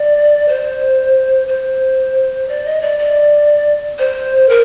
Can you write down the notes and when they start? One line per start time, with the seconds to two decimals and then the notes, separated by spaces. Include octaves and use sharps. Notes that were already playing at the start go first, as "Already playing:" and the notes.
Already playing: D5
0.49 C5
1.48 C5
2.49 D5
2.65 D#5
2.82 D5
2.99 D5
3.99 C5
4.49 A#4